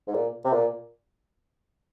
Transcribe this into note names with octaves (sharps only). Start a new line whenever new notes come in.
G#2
A#2
C3
A#2